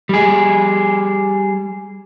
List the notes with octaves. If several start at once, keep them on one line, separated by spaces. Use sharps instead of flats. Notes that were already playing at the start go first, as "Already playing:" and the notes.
G3 G#4